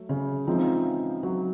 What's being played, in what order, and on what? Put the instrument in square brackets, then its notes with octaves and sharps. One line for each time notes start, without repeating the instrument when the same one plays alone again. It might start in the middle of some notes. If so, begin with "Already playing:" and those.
Already playing: [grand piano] F#3 A3
[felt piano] C#3
[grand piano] C#3 E3 G#3 C4 D#4 [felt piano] F3
[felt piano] F#3